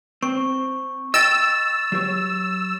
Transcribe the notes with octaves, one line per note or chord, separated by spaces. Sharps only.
C4 C#6
D#5 G5 E6 A6
F#3 G4 C#5